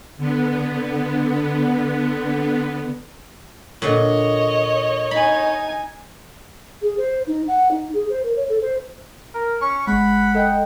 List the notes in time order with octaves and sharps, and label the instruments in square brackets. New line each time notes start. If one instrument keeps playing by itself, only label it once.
[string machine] D3 B3
[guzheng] A#2 D3 [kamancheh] C#5 D#5
[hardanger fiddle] D#4 G#5 [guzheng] B5
[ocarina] G#4
C5
D#4
F#5
D#4
G#4
C5
A#4
C#5
A4
C5
[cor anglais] A#4
[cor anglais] C#4 [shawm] C#6
[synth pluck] G1 G#3 [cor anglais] F#5 [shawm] B5
[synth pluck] A4 D#5 G5